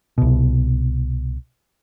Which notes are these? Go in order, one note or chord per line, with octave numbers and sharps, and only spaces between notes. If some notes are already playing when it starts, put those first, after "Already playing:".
C2 B2